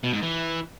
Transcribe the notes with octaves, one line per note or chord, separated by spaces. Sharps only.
B2
G#2
E3